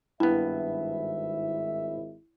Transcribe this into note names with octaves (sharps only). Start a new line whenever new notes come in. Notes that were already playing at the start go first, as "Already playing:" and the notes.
G#1 G2 B3 E4 E5